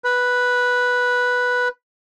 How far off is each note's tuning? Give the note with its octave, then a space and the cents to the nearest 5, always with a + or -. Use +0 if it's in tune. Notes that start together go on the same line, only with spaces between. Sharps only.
B4 -5